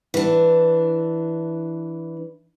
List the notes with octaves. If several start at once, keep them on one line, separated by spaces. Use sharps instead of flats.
E3 D4